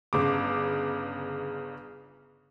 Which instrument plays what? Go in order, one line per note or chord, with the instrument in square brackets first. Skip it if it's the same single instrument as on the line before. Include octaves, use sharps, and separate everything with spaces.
[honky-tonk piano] G1 C#3 D6